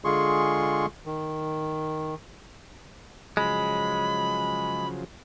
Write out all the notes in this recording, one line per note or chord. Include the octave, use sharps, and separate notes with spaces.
D3 G#3 F4 G#4 C6 C#6
D#3
C#3 F3 F#3 G#3 B5